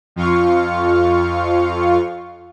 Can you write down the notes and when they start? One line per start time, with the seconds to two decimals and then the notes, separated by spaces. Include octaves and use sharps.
0.16 F2 F4 F5 C#6